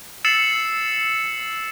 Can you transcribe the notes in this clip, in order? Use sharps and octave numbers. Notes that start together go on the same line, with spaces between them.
E6 A6 C7 C#7 E7 F#7